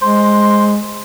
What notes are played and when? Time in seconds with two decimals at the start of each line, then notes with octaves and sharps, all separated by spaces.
0.02 G#3 C5